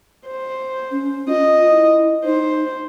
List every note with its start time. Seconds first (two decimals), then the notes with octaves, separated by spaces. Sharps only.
0.27 C5
0.91 C#4
1.29 F4 D#5
1.71 E4
2.24 D#4 C5